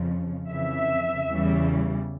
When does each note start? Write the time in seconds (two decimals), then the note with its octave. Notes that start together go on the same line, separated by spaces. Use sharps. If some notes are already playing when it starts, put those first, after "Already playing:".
Already playing: F2 C#3 F3
0.48 F2 C#3 E3 E5
1.28 E2 C#3 E3 G3